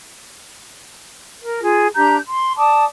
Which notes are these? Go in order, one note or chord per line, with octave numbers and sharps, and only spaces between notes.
A#4
F4 G#4
D4 G4 A#5 G6
C6
D5 A5 D6 D#6